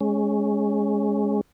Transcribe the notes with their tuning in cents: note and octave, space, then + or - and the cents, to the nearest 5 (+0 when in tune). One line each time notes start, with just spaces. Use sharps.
G#3 +0 C#4 +0